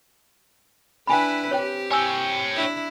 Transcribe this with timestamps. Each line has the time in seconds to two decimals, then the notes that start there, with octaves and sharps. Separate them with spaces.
1.07 D4 E4 B4 G5 G#5 B5
1.51 C4 G4 C#5 G5
1.91 C#5 G5 G#5 E6
2.54 D4 E4